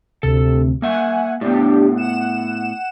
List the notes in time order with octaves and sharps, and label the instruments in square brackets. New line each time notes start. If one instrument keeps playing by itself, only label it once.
[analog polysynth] D2 C3 [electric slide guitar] A4
[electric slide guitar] A#3 E5 [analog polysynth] F#5 G#5
[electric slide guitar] A2 B3 [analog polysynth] D4 G4
[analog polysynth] F#5 E7